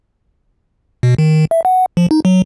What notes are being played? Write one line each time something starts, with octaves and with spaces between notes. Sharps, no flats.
B2
D#3
E5
F#5
F3
D#4
F#3